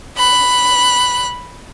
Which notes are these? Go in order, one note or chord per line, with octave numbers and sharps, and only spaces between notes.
B5 F#6